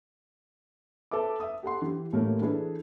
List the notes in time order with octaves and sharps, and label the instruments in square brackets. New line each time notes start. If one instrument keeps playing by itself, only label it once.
[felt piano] A4 B4 E5 D6
E5 D#6
G4 A4 F#5 C6
E3 G4
A1 A2 A3 A#3 G4 A#4
E3 D4 E4 G#4 A4 B4